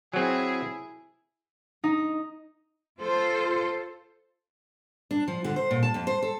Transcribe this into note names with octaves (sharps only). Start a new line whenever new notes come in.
F#3 C4 E4 G#4
D#4
F4 A4 C5
D4
F3
D3
C5
A#2
A5
F2
C5
A4